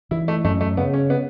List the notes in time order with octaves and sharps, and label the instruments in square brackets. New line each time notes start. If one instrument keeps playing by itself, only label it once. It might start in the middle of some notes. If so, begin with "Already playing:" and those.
[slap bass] E3 [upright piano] E4
[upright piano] A3
[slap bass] F#2 [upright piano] A3
[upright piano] A3
[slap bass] C#3 [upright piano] B3
[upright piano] C#4
B3